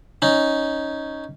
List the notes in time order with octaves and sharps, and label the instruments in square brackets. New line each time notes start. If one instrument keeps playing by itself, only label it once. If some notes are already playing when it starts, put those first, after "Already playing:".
[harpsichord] C#4 D#4